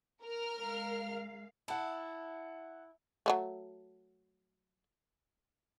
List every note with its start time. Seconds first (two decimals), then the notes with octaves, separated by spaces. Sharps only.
0.23 A#4 F6
0.60 G#3 F5
1.68 E4 F#5 A5
3.26 F#3 G#3 A3